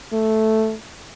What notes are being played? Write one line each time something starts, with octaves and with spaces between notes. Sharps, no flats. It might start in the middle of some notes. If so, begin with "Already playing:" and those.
A3